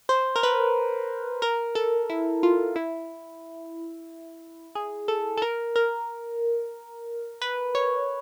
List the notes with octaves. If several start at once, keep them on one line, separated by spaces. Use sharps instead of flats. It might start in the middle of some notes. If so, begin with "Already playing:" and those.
C5
A#4
B4
A#4
A4
E4
F4
E4
G#4
A4
A4
A#4
A#4
B4
C#5